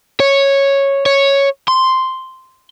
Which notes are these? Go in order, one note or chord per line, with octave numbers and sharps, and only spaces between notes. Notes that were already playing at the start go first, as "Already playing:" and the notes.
C#5
C#5
C6